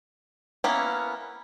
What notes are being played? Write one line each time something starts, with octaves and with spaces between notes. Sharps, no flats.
A#3 B3 C#4 E4